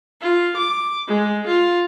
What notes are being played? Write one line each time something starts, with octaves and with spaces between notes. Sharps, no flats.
F4
D6
G#3
F4